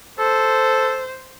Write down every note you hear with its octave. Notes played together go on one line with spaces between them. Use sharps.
A4 C5